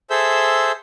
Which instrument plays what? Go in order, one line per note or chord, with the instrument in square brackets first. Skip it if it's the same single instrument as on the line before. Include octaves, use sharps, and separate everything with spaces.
[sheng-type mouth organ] G#4 A4 C5 E5 E6 G6